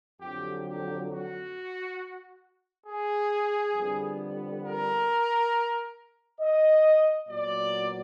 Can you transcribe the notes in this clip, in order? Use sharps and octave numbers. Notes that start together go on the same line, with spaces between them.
F2 D3 F#3 G4
G4
F#4
G#4
F2 D3 G3 B3
A#4
D#5
A#2 F#3 B3 D5